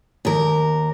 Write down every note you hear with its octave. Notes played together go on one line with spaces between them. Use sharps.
D#2 A#4